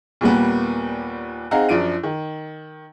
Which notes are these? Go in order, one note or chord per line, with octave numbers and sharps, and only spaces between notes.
D#2 A#2 G3 A#3 B3
C4 D#4 G#4 F5 F#5 A#5
F#2 F3 D4 D7 D#7
D#3